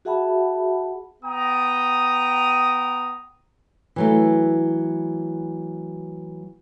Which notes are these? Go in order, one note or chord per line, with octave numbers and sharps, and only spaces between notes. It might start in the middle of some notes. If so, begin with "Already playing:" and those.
F#4 G#4 E5 F#5 A5 B5
B3 G5 A#5 D#6
E3 F#3 A3